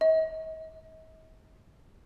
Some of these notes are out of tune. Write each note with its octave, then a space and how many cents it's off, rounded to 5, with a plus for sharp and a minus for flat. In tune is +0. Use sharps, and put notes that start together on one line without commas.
D#5 +45